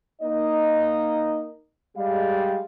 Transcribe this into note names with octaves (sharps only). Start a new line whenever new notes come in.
A#3 D#4 D#5
G3 G#3 F5